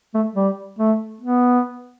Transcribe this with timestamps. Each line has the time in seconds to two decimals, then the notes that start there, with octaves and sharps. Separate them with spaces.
0.15 A3
0.35 G3
0.79 A3
1.21 B3